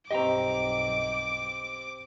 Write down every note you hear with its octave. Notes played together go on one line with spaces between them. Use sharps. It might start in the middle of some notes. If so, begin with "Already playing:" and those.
B1 G2 C4 G4 D#5 G5 A#5 D6